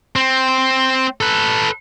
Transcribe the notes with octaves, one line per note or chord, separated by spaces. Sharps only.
C4
A4 B4